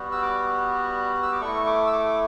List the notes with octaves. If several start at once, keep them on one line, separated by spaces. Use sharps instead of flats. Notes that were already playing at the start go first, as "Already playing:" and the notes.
Already playing: G3 B3 F#4
E6
D6
E6
D6
A3 E4 C#6
D6
E6
D6